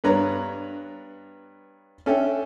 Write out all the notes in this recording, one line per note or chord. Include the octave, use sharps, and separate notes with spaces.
G2 B3 D4 B4 C#5 A#5
C#4 D4 A4 E5 G5